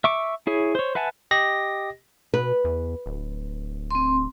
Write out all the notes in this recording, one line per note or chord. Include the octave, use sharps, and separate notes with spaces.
E5 C#6 D6
E4 G#4 C#5
C5 C#5
B4 E5 F#5 G#5 A5
G4 D#5 A#6
B2 B4
E2
D1
C4 C6